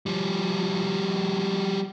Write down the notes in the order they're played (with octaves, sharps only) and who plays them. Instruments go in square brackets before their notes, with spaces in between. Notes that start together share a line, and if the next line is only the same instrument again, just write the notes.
[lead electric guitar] F3 G3